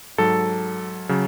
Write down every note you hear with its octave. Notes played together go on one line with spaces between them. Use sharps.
G#2 F#3 A4
C#3 F#3